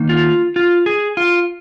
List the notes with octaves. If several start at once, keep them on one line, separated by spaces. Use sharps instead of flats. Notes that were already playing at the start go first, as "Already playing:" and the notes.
Already playing: D#3 A#3 D#4
F4
F4
G#4
F4